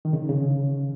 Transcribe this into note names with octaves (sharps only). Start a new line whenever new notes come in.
D#3
C#3
C#3